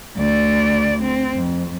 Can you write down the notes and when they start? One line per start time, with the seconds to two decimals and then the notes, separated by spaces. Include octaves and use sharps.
0.16 D2 D5
1.01 C4
1.34 F2